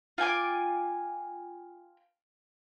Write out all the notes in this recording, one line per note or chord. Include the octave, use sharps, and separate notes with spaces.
F4 G5 G#5 D6